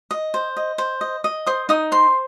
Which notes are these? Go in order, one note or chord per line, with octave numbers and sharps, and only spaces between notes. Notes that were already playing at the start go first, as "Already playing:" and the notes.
D#5
C5
D#5
C5
D#5
D#5
C5 D#6
D#4 D#6
C5 C6